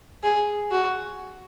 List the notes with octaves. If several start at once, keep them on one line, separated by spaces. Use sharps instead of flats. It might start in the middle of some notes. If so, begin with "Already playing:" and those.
G#4
F#4